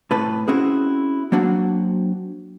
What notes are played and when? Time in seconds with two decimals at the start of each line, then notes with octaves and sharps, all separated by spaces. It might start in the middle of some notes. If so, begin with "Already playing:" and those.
0.11 A2 C3 B4 A5
0.48 C4 C#4 E4 F#4 G#4
1.32 F#3 A#3 C4 D4 F#4